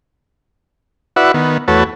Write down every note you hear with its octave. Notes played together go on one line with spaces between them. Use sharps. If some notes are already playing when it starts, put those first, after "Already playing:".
E4 F#4 B4 D5 E5 F#5
D#3 B3
E2 A3 F#4 B4 C#5 A5